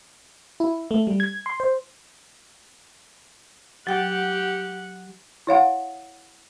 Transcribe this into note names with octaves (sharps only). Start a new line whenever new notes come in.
E4
A3
G3
G#6
C6
C5
F#3 G4 F#5 G5
E4 C#5 F5 F#5